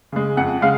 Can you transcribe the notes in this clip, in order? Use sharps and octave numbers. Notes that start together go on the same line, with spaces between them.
C#3 G#3
F2 F#5
C#3 G#3 F5